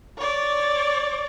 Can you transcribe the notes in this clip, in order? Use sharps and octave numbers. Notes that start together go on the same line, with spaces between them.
C#5 D5